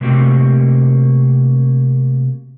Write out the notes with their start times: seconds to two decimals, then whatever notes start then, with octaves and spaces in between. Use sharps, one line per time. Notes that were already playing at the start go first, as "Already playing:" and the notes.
0.01 C3 A3 A#3 C4 F#4 G4